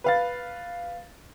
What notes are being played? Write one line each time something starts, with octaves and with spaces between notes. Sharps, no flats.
B4 F5 A6